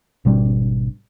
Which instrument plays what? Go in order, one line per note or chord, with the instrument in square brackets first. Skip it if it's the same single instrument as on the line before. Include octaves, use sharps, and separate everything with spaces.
[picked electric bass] G#1 B2 G3 D4